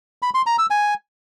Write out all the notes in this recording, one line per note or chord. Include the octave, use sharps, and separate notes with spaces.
B5
C6
A#5
E6
G#5